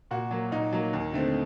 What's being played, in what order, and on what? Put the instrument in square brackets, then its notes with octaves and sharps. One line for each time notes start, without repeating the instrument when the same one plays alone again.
[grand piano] A#2 F#4
F#3 A#3
A#2 D#4
F#3 A#3
D#2
D3 A3 C4